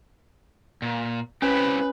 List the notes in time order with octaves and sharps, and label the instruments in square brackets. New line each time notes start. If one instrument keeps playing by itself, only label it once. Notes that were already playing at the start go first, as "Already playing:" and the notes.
[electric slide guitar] A#2
[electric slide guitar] C4 E4 G4 [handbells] C#4 [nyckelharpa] B4